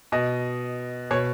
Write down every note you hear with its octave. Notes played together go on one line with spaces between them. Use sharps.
B2 D#5
B2 C#5